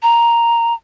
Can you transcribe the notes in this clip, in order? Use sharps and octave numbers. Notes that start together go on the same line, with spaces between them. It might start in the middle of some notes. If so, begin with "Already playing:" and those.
A#5